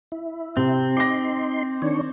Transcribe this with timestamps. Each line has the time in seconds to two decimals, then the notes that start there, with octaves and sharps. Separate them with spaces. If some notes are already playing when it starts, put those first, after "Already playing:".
0.12 E4
0.57 C3 C4
0.97 D#4 C6 D6 A#6
1.82 D#3 D4 C#5